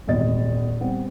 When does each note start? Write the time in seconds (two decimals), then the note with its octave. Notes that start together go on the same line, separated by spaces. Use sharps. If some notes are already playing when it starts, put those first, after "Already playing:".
0.07 D#1 G#1 E2 D#5 A6
0.80 G3 B3 C4